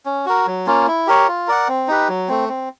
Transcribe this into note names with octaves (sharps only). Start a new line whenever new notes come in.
C#4
F#4 A#4
F#3
A#3 C#4 F4
E4
G4 A#4 C#5
F4
A#4 D5 F#5
C4
D#4 G4 B4
F#3
A3 C4
C4